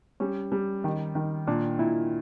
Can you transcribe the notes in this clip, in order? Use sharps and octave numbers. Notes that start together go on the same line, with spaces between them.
G3 C#4
G3
D#3
D#3
A#2 D4
A#2 E4